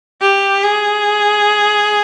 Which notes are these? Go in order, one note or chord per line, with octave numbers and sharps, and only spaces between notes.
G4
G#4